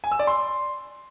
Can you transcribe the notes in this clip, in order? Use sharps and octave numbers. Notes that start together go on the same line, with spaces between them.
G#5
E6
D5
C6